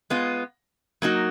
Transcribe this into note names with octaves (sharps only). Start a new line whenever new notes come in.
G#3 B3 F4
F#3 A#3 D#4 F#4